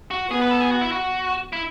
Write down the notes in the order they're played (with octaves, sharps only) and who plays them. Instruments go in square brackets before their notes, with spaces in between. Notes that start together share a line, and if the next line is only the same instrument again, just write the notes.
[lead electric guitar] F#4
[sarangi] B3 [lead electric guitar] G#4
[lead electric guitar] B4
A4
G#4
F#4
E4
F#4
E4